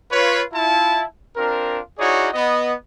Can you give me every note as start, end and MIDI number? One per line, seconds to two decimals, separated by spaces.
0.12 0.42 65
0.12 0.42 71
0.12 0.42 73
0.53 1.04 64
0.53 1.04 65
0.53 1.04 81
1.37 1.79 60
1.37 1.79 62
1.37 1.79 65
1.37 1.79 70
1.99 2.29 63
1.99 2.29 64
1.99 2.29 66
1.99 2.29 68
1.99 2.29 73
1.99 2.29 74
2.33 2.74 59
2.33 2.74 75